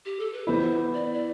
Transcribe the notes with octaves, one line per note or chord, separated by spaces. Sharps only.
G4
A4
B4
E3 B3 E4 C5
D5
D5